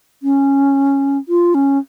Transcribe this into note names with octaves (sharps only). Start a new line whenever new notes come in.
C#4
F4
C#4